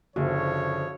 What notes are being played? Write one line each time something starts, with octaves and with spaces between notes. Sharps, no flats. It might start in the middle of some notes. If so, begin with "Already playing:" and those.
F#1 D3 F3 F#4 C#5